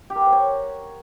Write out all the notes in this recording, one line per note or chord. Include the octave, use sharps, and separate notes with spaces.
G4
A#4
F#5
C5
C#5